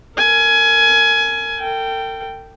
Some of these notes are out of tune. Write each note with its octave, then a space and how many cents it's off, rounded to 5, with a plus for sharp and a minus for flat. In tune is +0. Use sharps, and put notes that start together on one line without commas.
A#4 -25 G#5 +20
A4 +45 G5 -5